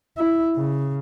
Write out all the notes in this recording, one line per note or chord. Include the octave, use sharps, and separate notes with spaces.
E4
C#3